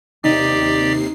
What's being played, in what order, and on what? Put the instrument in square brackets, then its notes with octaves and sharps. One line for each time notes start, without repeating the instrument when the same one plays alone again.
[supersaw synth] D#2 C3 C7 [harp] D#4 [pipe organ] G4 D5